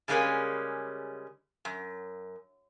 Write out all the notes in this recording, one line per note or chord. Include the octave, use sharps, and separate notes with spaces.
C#3 G3 G#3 A#3 C#4
F#2